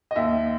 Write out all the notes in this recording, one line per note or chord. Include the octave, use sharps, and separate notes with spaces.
D#5
D#2 E5